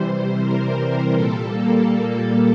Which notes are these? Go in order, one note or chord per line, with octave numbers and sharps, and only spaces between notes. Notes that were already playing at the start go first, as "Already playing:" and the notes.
Already playing: C3 E3 G3 C5
A#4
A#2 G3 A4
A#3
A#3